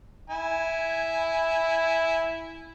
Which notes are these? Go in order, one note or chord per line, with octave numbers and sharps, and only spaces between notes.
E4 G#5